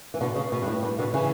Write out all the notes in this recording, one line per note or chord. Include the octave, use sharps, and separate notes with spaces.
E3
B2 D3
C#3
B2
G2
A2
G2
B2 D3
C#3 E3